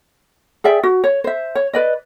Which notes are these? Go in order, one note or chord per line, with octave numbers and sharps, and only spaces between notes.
G#4 D5 E5 G5
F#4
C#5
C5 E5
C#5
B4 D5 D#5